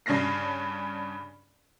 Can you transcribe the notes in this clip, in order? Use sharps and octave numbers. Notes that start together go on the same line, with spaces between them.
G2 C#3 C#4 D4 A#6 C7